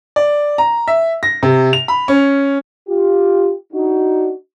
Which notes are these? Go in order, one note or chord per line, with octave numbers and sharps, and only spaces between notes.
D5
A#5
E5
A#6
C3
F7
B5
C#4
F4 G4
D4 D#4 F#4